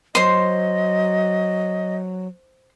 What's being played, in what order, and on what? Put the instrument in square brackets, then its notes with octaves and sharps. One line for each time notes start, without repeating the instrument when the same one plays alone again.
[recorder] F#3 [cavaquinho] C5 C6 [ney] D#5